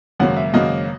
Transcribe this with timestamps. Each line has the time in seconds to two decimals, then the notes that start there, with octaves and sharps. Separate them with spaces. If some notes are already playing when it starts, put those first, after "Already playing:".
0.20 G#1 F#2 C#3 F#3 A#3 F#5
0.37 E5
0.54 G#1 F#2 C#3 F#3 A#3 D#5